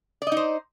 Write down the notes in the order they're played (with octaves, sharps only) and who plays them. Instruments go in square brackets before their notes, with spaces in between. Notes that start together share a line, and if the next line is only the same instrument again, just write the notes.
[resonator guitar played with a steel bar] D5
D#5
D#4
C5